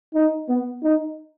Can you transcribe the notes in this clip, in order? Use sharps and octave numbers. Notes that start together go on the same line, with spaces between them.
D#4
B3
D#4